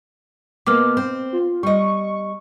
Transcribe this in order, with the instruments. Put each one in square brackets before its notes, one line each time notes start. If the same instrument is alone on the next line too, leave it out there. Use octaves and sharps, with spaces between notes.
[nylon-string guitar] B2 A#3 B3 [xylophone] D6 F6
[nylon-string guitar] C4
[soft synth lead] F4
[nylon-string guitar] G3 D#5 [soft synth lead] C#6